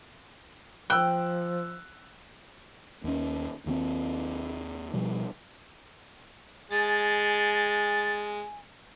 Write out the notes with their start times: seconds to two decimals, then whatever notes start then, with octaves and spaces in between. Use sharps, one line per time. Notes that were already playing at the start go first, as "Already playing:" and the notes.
0.90 F3 G5 E6 F#6
3.04 D#2 C#4
3.66 D#2 D#3 F3 C4
4.93 B2 F3 G3
6.71 G#3 G#5 A6